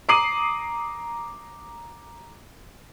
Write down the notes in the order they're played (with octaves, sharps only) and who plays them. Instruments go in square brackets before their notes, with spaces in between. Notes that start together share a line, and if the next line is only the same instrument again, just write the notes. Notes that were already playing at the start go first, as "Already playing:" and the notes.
[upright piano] A#5 D6 D#6 C7 D#7 F#7